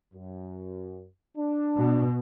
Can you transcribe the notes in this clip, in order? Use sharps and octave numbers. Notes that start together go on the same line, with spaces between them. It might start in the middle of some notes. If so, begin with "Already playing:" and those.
F#2
D4
B2